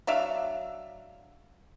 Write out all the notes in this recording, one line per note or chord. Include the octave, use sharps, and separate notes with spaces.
F#3 D4 E5 F5